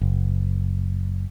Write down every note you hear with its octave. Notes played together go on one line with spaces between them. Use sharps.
F#1